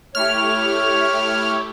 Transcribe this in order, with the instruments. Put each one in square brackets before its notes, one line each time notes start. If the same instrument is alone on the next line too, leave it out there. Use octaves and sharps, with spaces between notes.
[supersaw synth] A3 E4 G4 [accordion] C#5 [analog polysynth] F6